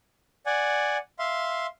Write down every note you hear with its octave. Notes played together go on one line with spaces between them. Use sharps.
D5 F#5 G#5
E5 F5 C6